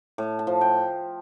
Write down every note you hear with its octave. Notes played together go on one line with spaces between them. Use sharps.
A2
A5
F3
G5